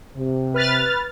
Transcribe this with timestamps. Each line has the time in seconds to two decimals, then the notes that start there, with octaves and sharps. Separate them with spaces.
0.16 C3
0.54 B4 F6 A6